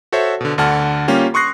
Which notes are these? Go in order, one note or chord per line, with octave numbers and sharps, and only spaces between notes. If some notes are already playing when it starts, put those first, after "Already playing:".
F#4 A4 C5 C#5 E5
B2 D3
D2 D3 F#5 A5 F6
G3 A#3 C#4 F4 G4
C6 C#6 D#6 F#6 A#6 C7